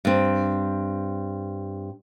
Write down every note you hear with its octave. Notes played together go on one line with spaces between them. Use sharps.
G2 C4